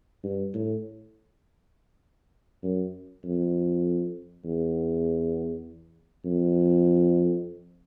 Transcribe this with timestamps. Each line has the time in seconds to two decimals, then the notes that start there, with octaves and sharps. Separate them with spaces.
0.24 G2
0.54 A2
2.63 F#2
3.24 F2
4.44 E2
6.25 F2